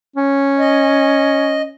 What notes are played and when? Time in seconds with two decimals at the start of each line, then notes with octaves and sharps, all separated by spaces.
0.16 C#4
0.59 D#5